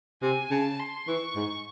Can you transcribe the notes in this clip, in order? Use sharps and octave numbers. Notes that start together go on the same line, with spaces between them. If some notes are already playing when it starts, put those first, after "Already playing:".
C3 G#5
C#3 A5
C6
E3 C#6
G#2